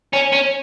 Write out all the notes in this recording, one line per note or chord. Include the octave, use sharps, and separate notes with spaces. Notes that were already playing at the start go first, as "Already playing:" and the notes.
C#4
C#4